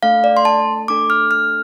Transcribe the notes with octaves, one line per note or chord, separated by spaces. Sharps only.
A3 D4 A4 F5
D5
C6
A5
A3 D4 A4 D6
F6
F6